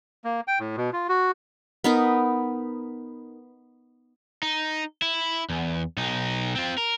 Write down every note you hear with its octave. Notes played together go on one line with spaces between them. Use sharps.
A#3
G5
A2
B2
F4
F#4
B3 D#4 A#4
D#4
E4
E2
B1 D#4
C4 F4
A#4